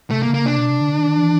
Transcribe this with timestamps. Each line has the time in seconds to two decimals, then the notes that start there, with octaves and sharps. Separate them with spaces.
0.11 C3 A3
0.23 A#3
0.29 C#3
0.34 A#3
0.46 C3 D4
0.58 B2
0.70 C3
0.81 D3
0.99 D#3
1.17 E3